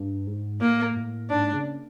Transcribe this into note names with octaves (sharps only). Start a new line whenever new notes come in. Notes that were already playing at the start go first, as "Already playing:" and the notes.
Already playing: G2
G#2
A2 A#3
A2
G#2 D4
C#3